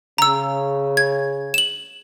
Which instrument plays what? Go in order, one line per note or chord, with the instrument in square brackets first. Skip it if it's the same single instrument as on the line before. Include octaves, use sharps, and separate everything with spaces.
[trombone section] C#3 [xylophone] A#5 E6
[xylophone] G#6
E7 F#7